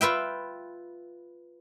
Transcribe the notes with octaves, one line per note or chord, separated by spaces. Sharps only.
F4 B4 E5 G5